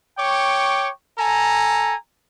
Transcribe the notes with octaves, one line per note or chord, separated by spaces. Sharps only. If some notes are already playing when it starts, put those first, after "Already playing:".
C#5 G5 C#6 D6
A4 G#5 A#5